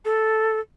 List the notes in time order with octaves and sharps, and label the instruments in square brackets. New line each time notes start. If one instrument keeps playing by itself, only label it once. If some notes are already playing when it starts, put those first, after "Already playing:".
[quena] A4